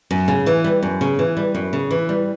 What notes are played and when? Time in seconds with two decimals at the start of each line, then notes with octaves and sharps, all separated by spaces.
0.11 F#2
0.28 C#3
0.46 E3
0.64 G3
0.83 F#2
1.01 C#3
1.19 E3
1.37 G3
1.55 F#2
1.73 C#3
1.91 E3
2.09 G3